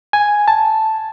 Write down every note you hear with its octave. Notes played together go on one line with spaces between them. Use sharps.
G#5
A5